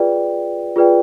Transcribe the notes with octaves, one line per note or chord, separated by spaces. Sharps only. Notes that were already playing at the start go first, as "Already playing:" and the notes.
Already playing: F4 G#4 B4 D5 G5
F4 G#4 B4 D5 G5